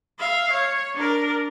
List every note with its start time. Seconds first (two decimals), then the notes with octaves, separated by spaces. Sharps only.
0.19 E5 F5
0.51 C#5
0.95 D4 A#4